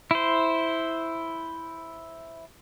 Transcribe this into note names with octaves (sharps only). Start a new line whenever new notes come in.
E4 C5